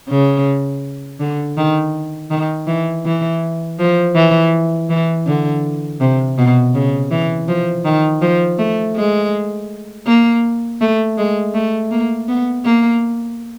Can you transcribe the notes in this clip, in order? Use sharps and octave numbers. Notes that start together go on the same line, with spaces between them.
C#3
D3
D#3
D#3
E3
E3
F3
E3
E3
D3
C3
B2
C#3
E3
F3
D#3
F3
A3
G#3
A#3
A3
G#3
A3
A#3
B3
A#3